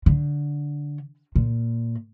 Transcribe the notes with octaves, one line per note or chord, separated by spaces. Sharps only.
D3
A#2